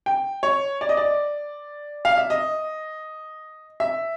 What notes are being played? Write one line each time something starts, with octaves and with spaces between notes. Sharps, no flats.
G5
C#5
D5
D#5
D5
F5
E5
D#5
E5